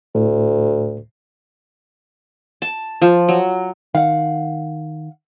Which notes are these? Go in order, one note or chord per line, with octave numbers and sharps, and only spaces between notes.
D2 A2
A5
F3
F#3
D#3 F5 F#5